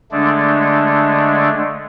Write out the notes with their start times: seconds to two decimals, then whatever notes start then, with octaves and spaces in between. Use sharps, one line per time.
0.12 D3 G#3 A3 D4